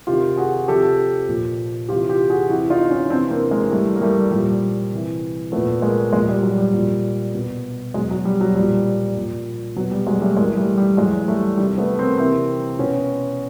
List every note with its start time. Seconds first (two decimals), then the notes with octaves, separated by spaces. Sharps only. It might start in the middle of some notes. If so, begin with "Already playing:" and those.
0.07 C3 D#3 F4 G4
0.37 F#4 G#4
0.68 C3 F3 G4 A4
1.28 A#2 F3
1.89 C3 E3 F4 G4
2.09 F4 G4
2.30 F#4 G#4
2.50 C3 E3 E4 F#4
2.70 D#4 F4
2.90 C#4 D#4
3.10 C3 C4 D4
3.13 E3
3.31 A#3 C4
3.51 G#3 A#3
3.71 A2 E3 G3 A3
3.96 A#3
4.02 G3 A3
4.31 A#2 F3 G3
4.92 C3 E3
5.52 F3 A3 B3
5.57 A#2
5.82 G#3 A#3
6.12 A#2 F3 G#3 A#3
6.28 G3
6.43 F#3
6.58 G3
6.74 A#2 F3
7.35 B2
7.94 B2 F#3 G#3
8.11 F#3
8.25 G3
8.41 F#3
8.56 A#2 F3 G3
9.16 A#2 F3
9.76 B2 F#3
9.91 G3
10.06 F#3 G#3
10.21 G3 A3
10.36 A2 E3 G#3 A#3
10.57 G3 A3
10.78 G3
10.97 A2 E3 F#3 G#3
11.28 G3 A3
11.58 C3 D#3 G3
11.78 A3 B3
11.98 A#3 C4
12.18 C3 E3 A#3 C4
12.79 B2 B3 C#4